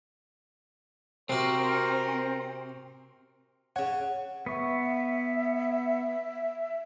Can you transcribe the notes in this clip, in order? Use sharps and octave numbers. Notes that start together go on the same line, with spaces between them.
C3 C4 F#4 A#4 C5
C#3 C#5 F#5
B3 E5 C#6